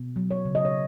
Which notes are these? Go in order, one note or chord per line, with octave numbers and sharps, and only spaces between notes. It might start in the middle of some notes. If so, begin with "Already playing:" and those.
Already playing: B2
F#3
C#5
C#3
D#5
C#5